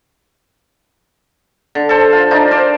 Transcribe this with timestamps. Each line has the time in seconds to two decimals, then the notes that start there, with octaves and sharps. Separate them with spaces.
1.75 D3
1.89 A4 C5
2.12 F4
2.31 D4 D#4 F4 C5
2.51 A#4 C5 D5